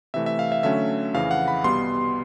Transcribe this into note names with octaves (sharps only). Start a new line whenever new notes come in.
C3 E3 A3 E5
E5
F5
E5
D3 F#3 A3 C#4 E5
F2 C#3 E3 F5
F#5
B5
C2 B2 G3 B3 C6